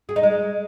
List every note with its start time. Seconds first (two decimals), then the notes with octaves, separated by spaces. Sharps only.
0.09 G#4
0.16 D#4
0.23 G#3